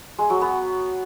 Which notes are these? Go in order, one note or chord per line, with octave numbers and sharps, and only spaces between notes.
G#3
F#3
B3